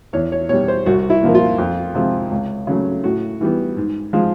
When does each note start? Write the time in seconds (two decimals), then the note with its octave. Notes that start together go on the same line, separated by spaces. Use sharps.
0.13 E2 C#5
0.32 C#5
0.49 B2 G3 C#5
0.68 C5
0.86 C2 F#4
1.10 E4
1.23 A#2 F3 A#3
1.35 F4
1.58 F2
1.94 C3 F3 G#3 C4
2.31 C#2
2.67 C#3 F#3 A3
3.04 A2 F#4
3.41 E3 G3 B3
3.77 G#2
4.13 F3 G#3